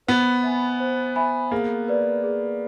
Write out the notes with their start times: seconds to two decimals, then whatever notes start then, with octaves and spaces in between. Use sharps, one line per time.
0.07 B3 C5
0.43 E5 G#5 B5
0.80 C5
1.16 E5 G#5 B5
1.51 A#3 G#4
1.88 B4 D5
2.24 G#4